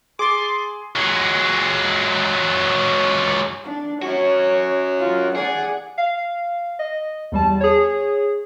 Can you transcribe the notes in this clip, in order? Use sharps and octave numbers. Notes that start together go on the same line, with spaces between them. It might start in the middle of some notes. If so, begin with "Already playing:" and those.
G#4 C6 D6 A6
F#3 G#3
D4
C#4 F#4 C#5
F4
G#4 D5 F#5
F5
D#5
E2 G3 A5
G#4 C#5